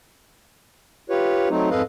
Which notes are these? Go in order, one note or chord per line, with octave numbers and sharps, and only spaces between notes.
F4 G4 B4 C#5
F#3 A3 C4 D#4
F2 G#2 A4 B4 D#5 F5